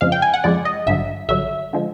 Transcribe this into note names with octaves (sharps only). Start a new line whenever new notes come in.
F2 C#3 F3 G#3 F5
G5
G#5
F#5
F2 C#3 F3 G#3 D5
D#5
A1 G2 D3 F#3 E5
A1 G2 D3 F#3 E5
D3 F3 G#3